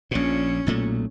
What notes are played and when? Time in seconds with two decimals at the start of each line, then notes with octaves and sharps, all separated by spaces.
0.11 A#1 A#2 C#4
0.67 B1 A#2 A3